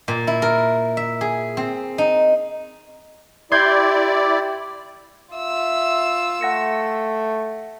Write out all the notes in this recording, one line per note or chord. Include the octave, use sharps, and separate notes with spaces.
A#2
E4
A#4
E5
G#4
C4
D#4
E4 G4 D5 C6 G6 G#6
F4 E5 E6
A3 F#5 A#6 C#7